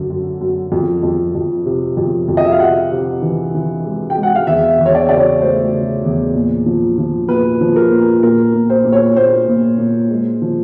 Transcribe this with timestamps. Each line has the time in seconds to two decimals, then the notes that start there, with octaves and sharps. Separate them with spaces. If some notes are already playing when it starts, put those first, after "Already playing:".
Already playing: F#2 D3
0.10 F#2
0.41 F#2
0.72 F2
1.03 F2
1.35 F2
1.66 C3
1.97 F2
2.29 F2
2.37 D#5
2.45 E5
2.52 F5
2.60 C3 F#5
2.92 C3
3.22 E3
3.54 E3
3.85 G#3
4.10 G5
4.16 G#3
4.23 F#5
4.35 F5
4.47 E2 E5
4.79 E2
4.86 C#5
4.95 D5
5.09 C#3 D5
5.17 C#5
5.41 A3 C5
5.73 C#3
6.04 E2
6.35 A#2
6.66 F3
6.98 F3
7.28 A#2 B4
7.61 F3
7.76 A#4
7.91 A#2
8.23 A#2 A#4
8.54 A#2
8.70 C5
8.85 A#2
8.92 C#5
9.16 A#2 C5
9.48 A#2
9.78 A#2
10.10 G#3
10.42 F3